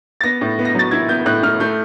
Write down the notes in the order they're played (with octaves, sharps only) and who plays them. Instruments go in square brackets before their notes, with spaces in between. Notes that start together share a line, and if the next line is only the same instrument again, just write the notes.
[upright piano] A6
B3 A#6
A2
B3
A#6
F#3 A6
E4 G#6
B3 G6
A2 F#6
A2 F6
A3 G6